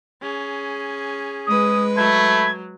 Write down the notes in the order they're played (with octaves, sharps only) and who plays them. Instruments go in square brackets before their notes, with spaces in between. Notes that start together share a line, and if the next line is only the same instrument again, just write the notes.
[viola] C#4 G#4
[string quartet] G#3 B4 [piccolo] D#6
[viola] F#3 [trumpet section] A3 B5 [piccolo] G#6